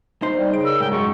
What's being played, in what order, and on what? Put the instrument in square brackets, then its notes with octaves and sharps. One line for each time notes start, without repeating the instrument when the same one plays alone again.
[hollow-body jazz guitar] D#4 C5
[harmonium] G3
[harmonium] C#3 [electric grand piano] D#5 D7
[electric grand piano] A#4 [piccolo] E6
[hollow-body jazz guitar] G#2 [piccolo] G5
[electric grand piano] F#2 F#3 G#3 [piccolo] C#6